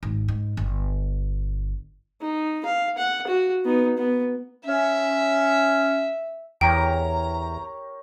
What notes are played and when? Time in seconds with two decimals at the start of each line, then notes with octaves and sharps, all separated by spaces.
0.03 G#1
0.28 G#2
0.57 G1
2.21 D#4
2.66 F5
2.98 F#5
3.27 F#4
3.65 B3 D#4
3.98 B3
4.66 C#4 E5
6.61 E2 G4 A#4 C#5 G5 A#5